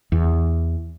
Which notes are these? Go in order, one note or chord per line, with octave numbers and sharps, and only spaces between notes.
E2